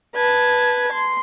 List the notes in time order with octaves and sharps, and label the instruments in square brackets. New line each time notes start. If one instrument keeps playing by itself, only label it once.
[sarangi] B4 [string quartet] A5 G#6
[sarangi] C6